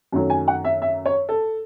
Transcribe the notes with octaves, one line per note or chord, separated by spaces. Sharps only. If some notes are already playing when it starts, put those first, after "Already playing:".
F#2 D#3 F#3 A3
G#5
F#5
E5
E5
C#5
A4